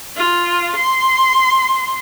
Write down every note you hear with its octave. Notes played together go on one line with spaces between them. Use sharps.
F4
C6